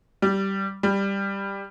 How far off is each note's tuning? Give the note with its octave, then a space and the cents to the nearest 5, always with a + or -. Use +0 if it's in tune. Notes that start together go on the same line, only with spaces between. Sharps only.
G3 -10
G3 +10